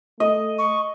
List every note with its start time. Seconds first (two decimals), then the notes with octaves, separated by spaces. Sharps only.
0.20 A3 D#5
0.58 C#6